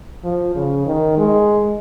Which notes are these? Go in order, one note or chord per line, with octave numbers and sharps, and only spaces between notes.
F3
C#3
D#3
G#3